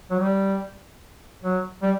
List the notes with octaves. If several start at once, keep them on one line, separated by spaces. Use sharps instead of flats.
F#3
G3
F#3
G3